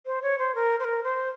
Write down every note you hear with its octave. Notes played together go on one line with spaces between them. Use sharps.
C5
C#5
C5
A#4
C5
A#4
C5